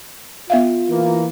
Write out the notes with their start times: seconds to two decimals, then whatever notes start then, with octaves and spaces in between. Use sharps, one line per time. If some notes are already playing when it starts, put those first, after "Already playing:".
0.50 B3 F4 E5 F5
0.90 E3 A#3